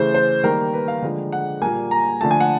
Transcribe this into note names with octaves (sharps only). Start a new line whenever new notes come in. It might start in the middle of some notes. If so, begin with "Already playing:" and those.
Already playing: C#3 E3 A3 C5
C5
D#3 G3 A#3 A#4
B4
F5
D3 F3 G#3
F#5
A#2 G3 A#3 G#5
A#5
D3 F3 A3 A5
G#5
F#5